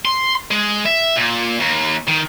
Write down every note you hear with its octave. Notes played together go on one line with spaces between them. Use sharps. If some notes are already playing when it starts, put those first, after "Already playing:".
C6
G#3
E5
A#2
D#2
D#3